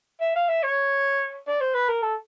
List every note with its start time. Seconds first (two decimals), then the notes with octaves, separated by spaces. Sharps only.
0.21 E5
0.36 F5
0.49 E5
0.63 C#5
1.47 D5
1.60 C5
1.74 B4
1.89 A#4
2.02 A4